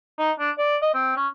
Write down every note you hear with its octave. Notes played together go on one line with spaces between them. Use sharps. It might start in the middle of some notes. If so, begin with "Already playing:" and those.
D#4
D4
D5
D#5
C4
C#4